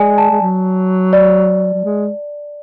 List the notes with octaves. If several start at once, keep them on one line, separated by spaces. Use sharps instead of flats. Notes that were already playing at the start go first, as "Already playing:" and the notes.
Already playing: G#3 D5 G#5
A5
G#3
F#3
D5
F#3
G#3